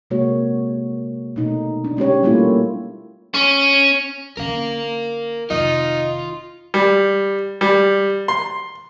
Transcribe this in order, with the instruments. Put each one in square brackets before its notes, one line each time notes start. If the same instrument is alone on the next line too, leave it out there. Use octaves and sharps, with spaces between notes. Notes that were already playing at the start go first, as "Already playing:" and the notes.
[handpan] C3 G#3 A#3 F#4 C#5
B2 A3 D#4
D4
G#3 C#4 G4 C#5
G3 A3 A#3 E4 F4
[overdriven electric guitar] C#4
[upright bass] D3 C#4 [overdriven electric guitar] A#4 F5
[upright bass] F1 D#3 [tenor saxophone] D#4 [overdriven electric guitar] F4
[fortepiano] G3
G3
C6